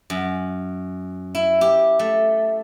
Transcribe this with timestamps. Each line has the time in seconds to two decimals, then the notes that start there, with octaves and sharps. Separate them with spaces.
0.10 F#2
1.35 E4
1.61 G4
1.99 A3